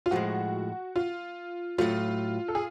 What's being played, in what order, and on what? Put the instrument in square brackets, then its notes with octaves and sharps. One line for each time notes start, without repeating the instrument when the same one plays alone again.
[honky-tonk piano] F4
[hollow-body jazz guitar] A2 F3 G#3 [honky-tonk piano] F#4
[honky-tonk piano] F4
[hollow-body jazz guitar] A2 F#3 A3 [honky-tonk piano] F4
[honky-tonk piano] A4
G#4